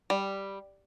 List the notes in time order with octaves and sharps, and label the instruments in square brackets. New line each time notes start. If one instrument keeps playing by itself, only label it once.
[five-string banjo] G3